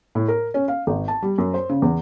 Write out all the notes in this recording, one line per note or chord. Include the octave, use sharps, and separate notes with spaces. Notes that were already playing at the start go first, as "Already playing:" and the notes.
A2
A#4
C#4
F5
G#1
A5
G3
F#2
C5
C#3
E2